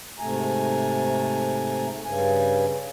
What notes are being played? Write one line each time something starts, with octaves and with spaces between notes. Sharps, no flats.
G#2 C3 A3 G#5 A#5
G2 C#3 G#5